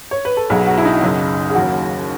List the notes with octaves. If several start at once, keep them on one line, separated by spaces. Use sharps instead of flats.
C#5
B4
A4
B1 B2 F#3 G#4
F#4
E4
D#4
F#1 F#2 C#3
G#4
D#2 C#3 F#3 F#4